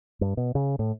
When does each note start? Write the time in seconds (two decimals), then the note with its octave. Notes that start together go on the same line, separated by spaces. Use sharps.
0.21 G2
0.37 B2
0.55 C#3
0.79 A2